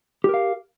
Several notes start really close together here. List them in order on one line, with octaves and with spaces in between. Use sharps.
G4 A#4 F5